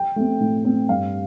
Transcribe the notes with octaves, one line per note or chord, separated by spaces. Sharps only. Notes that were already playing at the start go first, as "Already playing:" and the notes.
Already playing: G5
A3 C4
A2
A3 C4
G2 F5